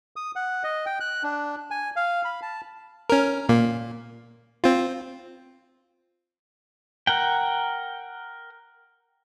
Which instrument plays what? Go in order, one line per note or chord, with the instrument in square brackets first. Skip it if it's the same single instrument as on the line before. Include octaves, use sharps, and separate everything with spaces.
[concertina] D#6
F#5
D#5
G5
F#6
D4
G#5
F5
B5
A5
[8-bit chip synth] C#4 A#4
A#2 A#3
C4 F4
[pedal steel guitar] A#4 F#5 G5